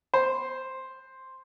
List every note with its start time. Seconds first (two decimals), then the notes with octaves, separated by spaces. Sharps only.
0.14 C5